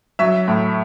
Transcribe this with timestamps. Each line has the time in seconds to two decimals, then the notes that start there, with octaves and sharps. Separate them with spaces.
0.19 F#3 E5
0.48 A2